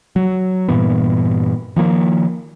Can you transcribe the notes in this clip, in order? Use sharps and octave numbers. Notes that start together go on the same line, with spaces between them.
F#3
G2 A#2 E3 B3
D#3 F3 A#3